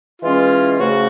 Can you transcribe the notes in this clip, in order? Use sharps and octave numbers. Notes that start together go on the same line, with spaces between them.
E3 G#3 C#4 F4
C#3 F3 A3 F#4